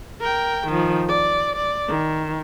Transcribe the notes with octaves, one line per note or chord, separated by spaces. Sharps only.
A#4 G5
D#3 F3
D5
D5
D#3